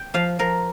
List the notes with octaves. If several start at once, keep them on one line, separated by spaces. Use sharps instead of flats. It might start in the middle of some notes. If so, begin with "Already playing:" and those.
Already playing: G5
F3 F5
F3 A#4